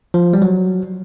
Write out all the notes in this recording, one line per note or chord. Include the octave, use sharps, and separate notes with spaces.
F3
G3
F#3